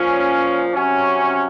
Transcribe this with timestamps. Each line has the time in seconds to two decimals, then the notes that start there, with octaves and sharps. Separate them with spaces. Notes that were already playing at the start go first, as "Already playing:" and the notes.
Already playing: A#2 F3 C#4
0.73 C3 F#3 C#4